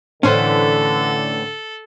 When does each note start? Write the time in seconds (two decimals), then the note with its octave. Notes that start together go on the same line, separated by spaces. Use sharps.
0.23 A2 D3 E3 C#4 A4 C5